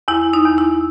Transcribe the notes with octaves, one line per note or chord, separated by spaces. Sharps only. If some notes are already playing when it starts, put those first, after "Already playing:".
E2 E4
D#4
E2
E4